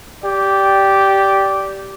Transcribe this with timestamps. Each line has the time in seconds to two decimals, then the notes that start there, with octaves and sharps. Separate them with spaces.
0.24 G4 D5